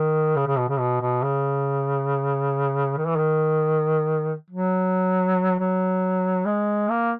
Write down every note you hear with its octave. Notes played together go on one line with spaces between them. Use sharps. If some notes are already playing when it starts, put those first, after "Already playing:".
Already playing: D#3
C#3
C#3
B2
C#3
B2
B2
C#3
D#3
E3
D#3
F#3
F#3
G#3
A#3